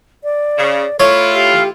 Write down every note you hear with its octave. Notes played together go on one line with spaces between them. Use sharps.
D5
C#3
A3 E4 F4 A4 C#5
G4 F5